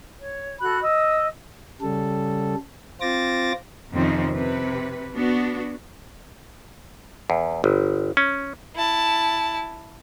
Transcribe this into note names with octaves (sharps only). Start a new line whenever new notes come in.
C#5
F#4 A4 B5 F#6
D#5 E6
C#3 G3 A4
C4 F4 C5 D6 A6 A#6
F2 C3 D#3 F3 C4 C#4
C3 B4
B3 D4 F#4
E2
G1
C#4
E4 A5